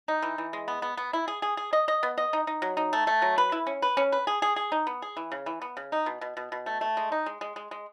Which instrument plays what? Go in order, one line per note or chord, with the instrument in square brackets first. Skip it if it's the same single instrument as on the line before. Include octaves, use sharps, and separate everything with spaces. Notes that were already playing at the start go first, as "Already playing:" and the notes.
[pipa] D#4
E3
E3
G#3
B3
B3
B3
E4
G#4
G#4
G#4
D#5
D#5
B3
D#5
D#4
D#4
F#3
D#4
A3
A3
F#3
B4
E4
C#4
B4
C#4
B4
G#4
G#4
G#4
D#4
B3
G#4
E3
C#3
E3
B3
C#3
D#4
B2
B2
B2
B2
A3
A3
G#3
D#4
G#3
G#3
G#3
G#3